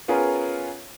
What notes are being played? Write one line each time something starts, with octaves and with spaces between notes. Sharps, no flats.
B3 C#4 F4 G#4 A#4